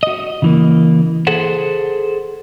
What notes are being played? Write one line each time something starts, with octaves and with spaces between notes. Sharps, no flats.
F#4 D#5
C#3 E3 A#3
G#4 A4 C5 F#5